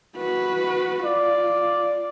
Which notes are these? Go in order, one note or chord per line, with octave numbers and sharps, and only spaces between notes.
F#4 B4
F4 D5